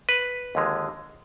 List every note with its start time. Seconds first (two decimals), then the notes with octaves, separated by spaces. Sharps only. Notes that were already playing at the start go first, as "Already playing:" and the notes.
0.09 B4
0.55 D#2 D3 F3 G#3